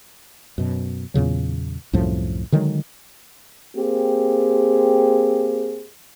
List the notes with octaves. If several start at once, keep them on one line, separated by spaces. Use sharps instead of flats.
F#2 B2
E2 A#2 C#3 F#3
C2 F#2 A2 F3
D3 D#3 F#3 G#3
A#3 C4 G4 G#4